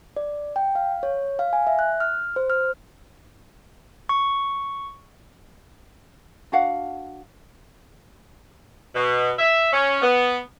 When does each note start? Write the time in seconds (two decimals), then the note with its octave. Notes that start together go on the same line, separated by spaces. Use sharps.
0.17 D5
0.56 G5
0.75 F5
1.03 C#5
1.39 F5
1.53 G#5
1.67 E5
1.79 F#6
2.00 F6
2.36 C5
2.50 F6
4.09 C#6
6.52 D4 F#4 F5 F#5
8.95 B2
9.39 E5
9.73 C#4
10.02 B3